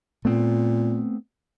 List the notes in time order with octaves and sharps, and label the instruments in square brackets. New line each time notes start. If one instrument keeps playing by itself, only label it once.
[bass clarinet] A#2 [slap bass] A3 B3 C4